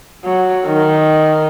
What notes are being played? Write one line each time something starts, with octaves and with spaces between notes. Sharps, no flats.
F#3
D#3